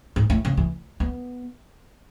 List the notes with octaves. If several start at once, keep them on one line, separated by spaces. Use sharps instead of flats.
G#2
A2
C#3
E3
B3